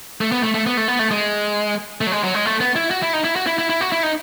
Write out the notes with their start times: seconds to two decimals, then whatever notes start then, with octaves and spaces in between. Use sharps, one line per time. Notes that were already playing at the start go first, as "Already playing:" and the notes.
0.21 A3
0.32 B3
0.43 A3
0.54 A3
0.66 B3
0.77 A3
0.88 B3
0.99 A3
1.11 G#3
2.01 A3
2.07 F#3
2.12 G#3
2.24 F#3
2.34 G#3
2.46 A3
2.60 B3
2.76 E4
2.91 F#4
3.02 E4
3.13 D#4
3.24 E4
3.36 F#4
3.47 E4
3.58 E4
3.69 E4
3.81 F#4
3.92 E4
4.03 D#4